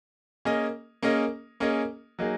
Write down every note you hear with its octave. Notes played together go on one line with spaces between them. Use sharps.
A#3 C#4 G#4 D#5
A#3 C#4 G#4 D#5
A#3 C#4 G#4 D#5
F#3 A#3 D#4 G#4